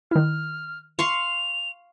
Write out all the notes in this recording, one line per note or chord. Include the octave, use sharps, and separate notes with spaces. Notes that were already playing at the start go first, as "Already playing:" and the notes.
D#3 E4 F6
F5 C6 C#6 F7